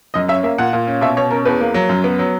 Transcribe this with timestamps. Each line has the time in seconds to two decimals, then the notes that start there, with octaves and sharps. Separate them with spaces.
0.14 F#2 D#5
0.28 C#4 E5
0.43 A#3 E5
0.58 A#2 F#5
0.73 A#2
0.87 C#4
1.01 B2 E5
1.17 B2 C#5
1.31 C#4 A#4
1.45 E2 B4
1.61 A#3
1.74 F#3
1.89 F#2
2.04 B3
2.19 F#3